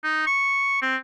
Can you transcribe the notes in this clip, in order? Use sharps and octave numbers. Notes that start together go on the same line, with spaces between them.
D#4
C#6
C4